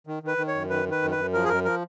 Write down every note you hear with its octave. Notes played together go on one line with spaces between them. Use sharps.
D#3
D#3 B4
D#3
C#5
F#2
D#3 B4
D#3
B4
F#2
B4
F#2
F3 A#4
G#4
F#2 A#4
F3 A#4